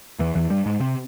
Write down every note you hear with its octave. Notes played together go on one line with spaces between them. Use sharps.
E2 E3
E2 E3
G2 G3
G#2 G#3
C3 C4